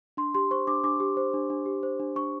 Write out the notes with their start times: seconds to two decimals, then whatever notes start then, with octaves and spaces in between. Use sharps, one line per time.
0.17 D4 C6
0.34 G4 C6
0.51 C5 C#6
0.67 D4 D6
0.84 D4 D6
1.00 G4
1.17 C5
1.34 D4
1.50 D4
1.66 G4
1.83 C5
2.00 D4
2.16 D4 C#6